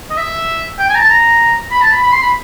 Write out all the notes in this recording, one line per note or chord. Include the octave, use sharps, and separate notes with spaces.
D#5
E5
G5
G#5
A#5
A5
A#5
B5
A5
B5
B5
C6
B5